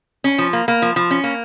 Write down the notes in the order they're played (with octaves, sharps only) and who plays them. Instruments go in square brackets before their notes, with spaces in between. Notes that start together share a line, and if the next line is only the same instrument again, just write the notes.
[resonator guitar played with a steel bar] C#4
F3
A#3
A#3
F3
F3
C#4
A#3